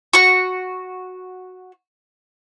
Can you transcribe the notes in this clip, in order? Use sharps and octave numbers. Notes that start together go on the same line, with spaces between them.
F#4 C#6